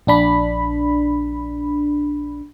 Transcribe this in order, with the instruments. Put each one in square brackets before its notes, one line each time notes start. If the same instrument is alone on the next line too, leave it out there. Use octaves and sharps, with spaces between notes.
[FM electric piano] A#1 D4 B5